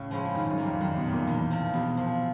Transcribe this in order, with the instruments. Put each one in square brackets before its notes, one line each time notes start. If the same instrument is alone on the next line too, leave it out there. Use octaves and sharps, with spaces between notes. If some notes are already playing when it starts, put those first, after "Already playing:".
Already playing: [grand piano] A2 [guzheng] C#3
[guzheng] F3 G#3 C#4 E4
[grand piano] G#2 [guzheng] D#3
[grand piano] F#2
[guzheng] G3 A#3
[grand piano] F2
[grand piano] F#2 [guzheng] D#3
[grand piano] B2
[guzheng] G3 A#3
[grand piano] A#2
[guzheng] E2
C3 F3
[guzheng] E2 [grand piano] B2
[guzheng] C3 F3